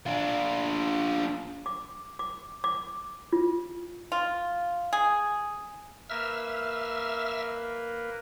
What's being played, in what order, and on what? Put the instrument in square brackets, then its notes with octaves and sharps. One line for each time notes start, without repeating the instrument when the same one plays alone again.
[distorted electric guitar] D4 F4
[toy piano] D6
D6
D6
F4
[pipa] F4
G#4
[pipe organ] A#3 A#4 B4 [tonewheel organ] E5 E6 F6